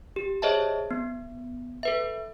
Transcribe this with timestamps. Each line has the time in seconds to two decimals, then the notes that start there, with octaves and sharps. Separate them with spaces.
0.16 G4
0.42 G#4 C5 C#5 D#5 E5 A5
0.91 B3
1.83 A4 B4 E5